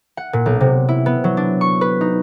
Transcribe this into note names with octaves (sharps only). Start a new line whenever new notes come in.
F#5
A#2
B1
C3
E4
B3
F#3
D4
C#6
B4
D#4